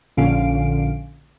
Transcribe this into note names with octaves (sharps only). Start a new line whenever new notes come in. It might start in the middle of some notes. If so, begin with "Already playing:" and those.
A#1 A#2 D3 C#4 F5 D7